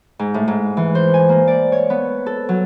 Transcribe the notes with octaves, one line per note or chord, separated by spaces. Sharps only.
G#2
A2
G#2
E3
C5
G#5
A#3
D5
C#5
B3
A4
F#3